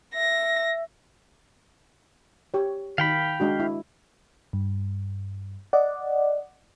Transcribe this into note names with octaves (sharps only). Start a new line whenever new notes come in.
E5 A#6
G4 C#5
D#3 F5 G5 B5
G#3 D4 F#4
E4
G2
D5 D#5 F#5